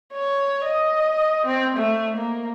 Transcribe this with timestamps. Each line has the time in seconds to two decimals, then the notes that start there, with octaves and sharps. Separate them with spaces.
0.14 C#5
0.65 D#5
1.46 C4
1.77 A3
2.16 A#3